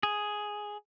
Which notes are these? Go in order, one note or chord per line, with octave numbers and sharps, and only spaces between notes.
G#4